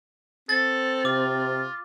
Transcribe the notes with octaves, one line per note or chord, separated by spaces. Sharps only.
C4 A4 A6
C3 F4 D6